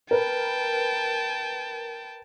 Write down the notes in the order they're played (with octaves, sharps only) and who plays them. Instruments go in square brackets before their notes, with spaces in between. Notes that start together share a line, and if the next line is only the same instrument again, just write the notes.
[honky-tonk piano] A#4 B4 [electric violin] G5 A5